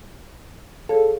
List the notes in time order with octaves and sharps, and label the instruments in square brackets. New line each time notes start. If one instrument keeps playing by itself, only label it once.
[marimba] G#4 C#5 F5 [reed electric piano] A4